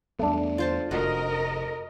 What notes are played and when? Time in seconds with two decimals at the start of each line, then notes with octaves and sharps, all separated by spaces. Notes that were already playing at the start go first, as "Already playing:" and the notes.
0.19 E2 G3 A3 B3 D4
0.58 F4 C5 A5
0.91 F1 F#4 A#4 D#5